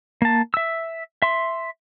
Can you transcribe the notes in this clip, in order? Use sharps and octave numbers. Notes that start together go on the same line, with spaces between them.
A#3 A5
E5 E6
E5 C6